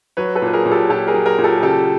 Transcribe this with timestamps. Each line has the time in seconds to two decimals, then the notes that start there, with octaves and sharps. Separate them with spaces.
0.17 F#3 B4 C#5
0.35 A4 B4
0.42 A#2
0.47 B4
0.53 G#4 A#4
0.65 A#2
0.72 G4 A4
0.90 A#2 G4 A4
1.07 G#4 A#4
1.14 F#3
1.26 G#4 A#4
1.38 A#2
1.44 G4 A4
1.56 G#4
1.63 C#3 G4 A4